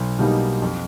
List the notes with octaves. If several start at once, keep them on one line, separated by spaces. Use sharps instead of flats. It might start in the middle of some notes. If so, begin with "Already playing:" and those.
Already playing: B1
B2 G3 A#3 D#4
F2